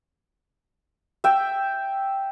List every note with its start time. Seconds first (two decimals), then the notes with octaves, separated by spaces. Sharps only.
1.24 E5 G5